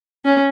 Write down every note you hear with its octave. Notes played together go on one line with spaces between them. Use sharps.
C#4